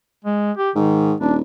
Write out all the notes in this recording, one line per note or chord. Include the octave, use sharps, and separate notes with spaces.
G#3
G4
G#2 D#3
D#1 D4